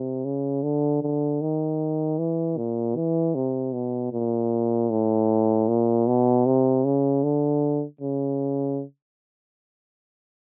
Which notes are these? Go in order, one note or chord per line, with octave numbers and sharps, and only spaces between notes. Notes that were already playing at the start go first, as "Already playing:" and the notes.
Already playing: C3
C#3
D3
D3
D#3
E3
A#2
E3
C3
B2
A#2
A2
A#2
B2
C3
C#3
D3
C#3